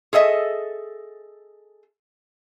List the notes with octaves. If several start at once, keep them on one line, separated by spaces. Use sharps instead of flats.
G#4 A4 D#5 E5